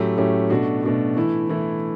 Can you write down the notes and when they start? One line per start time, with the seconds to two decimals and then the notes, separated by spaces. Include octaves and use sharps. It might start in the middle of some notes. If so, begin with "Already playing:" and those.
Already playing: A2 F#3 A3 C#4 G4
0.18 A2 F#3 A3 C#4 G4
0.50 B2 A3 D4 F#4
0.83 B2 A3 D4 F#4
1.16 E3 A3 E4
1.49 E3 A3 E4